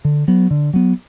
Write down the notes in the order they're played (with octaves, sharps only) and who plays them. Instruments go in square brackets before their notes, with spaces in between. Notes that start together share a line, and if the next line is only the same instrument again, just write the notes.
[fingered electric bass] D3
F#3 B3
D3
F#3 B3